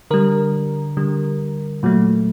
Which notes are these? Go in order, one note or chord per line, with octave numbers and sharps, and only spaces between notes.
D3 G3 A#4
D3 G3
A#2 F#3 A3